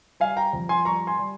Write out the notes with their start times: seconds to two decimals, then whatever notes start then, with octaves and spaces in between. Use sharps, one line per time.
0.20 G3 F5 G#5
0.37 G5 A#5
0.53 F2
0.69 G#5 C6
0.85 G3 A#5 C#6
1.07 G#5 C6
1.19 G3